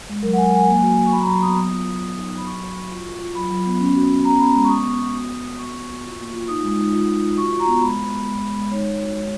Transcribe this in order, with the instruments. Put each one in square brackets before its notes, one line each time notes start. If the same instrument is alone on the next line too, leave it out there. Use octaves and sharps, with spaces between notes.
[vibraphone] G#3
F#3 A#4
F#5
F#3 G#5
F#3 G#5
A#3
F#4
F#4
C#6
F#3 B5
A#5
F#3 B5
B3 D#6
B3 D#6
F4
B3
F#3
D#4
F#3
B5
F#4 C#6
F#4
F#4
F4
F4
F4
F#3 B5
F#3
B3
C#4
F#4
C#4
B3 A#5
B3 B5
G#3
C#6
B3 D#6
B3
B3
F#4
B3
B3
F#4 C#6
B3
F#4
F4
A#3
F4
D#4 D#6
G#3
D#4
F4
F4
F4
F#4 C#6
F#4
A#5
B3
G#3 B5
G#3
B3
G#3
G#3
G#3
D#4 C#5
G#3
F#4
G#3